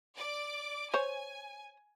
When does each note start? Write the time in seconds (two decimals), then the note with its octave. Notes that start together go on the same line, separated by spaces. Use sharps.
0.17 D5 D6
0.94 C5 C#5 G#5